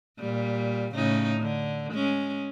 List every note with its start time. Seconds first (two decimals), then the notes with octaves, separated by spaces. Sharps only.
0.19 A#2 G3
0.94 A2 C#3 D#4
1.41 D3
1.93 G#3 C#4